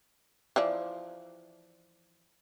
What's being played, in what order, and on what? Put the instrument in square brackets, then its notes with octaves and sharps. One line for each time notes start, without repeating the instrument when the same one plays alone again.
[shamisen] E3 F3 D5